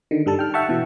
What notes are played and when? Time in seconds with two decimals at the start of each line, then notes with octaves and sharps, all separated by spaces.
0.11 D3 D#3
0.26 G2 G3 A4 A5
0.39 G5 F6
0.54 E5 F#5 G5 A5 C#6
0.69 B2 E3